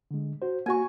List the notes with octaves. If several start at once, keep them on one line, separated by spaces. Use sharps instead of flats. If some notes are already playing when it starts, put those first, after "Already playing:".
D3 G#3
F#4 C5
A#3 F#4 G#5 C#6